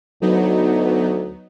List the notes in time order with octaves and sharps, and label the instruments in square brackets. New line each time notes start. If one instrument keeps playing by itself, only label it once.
[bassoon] D2 [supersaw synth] F#3 B3 D#4